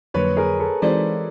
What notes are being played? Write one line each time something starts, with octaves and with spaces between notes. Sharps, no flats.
F2 D3 F#3 A#3 B4 C#5
G#4 A#4
A4 B4
E3 G#3 C4 D#4 F#4 C5 D5